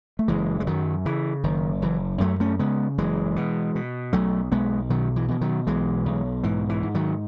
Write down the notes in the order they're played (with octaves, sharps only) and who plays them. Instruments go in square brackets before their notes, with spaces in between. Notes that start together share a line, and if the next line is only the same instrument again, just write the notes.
[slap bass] A3
F#1 E3 G#3
G#3
F#2 D#3 F#3
C#3 E3
F#1 D#3
F#1 E3
F#2 F#3 A3
A3 C#4
C#3 G#3 B3
F#1 E3 G#3
B2
B2
B1 F#3 A3
B1 G#3 B3
B2 D#3 F#3
E3
B2 E3
D#3 F#3
B1 E3 G#3
B1
G#2 E3
E3
G#2
D#3 F#3